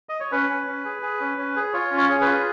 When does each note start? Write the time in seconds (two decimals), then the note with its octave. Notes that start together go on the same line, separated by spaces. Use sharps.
0.09 D#5
0.20 C#5
0.32 C#4 B4
0.49 C#4
0.67 C#4
0.85 G#4
1.02 G#4
1.20 C#4
1.38 C#4
1.56 G#4
1.73 F4 C#5
1.91 C#4
1.97 C#5
2.09 G#4
2.21 B4
2.27 F4